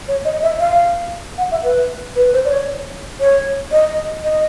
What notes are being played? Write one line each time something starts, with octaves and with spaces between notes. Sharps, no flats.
C#5
D#5
E5
F5
F#5
E5
B4
B4
C5
D5
C#5
C#5
D#5
D#5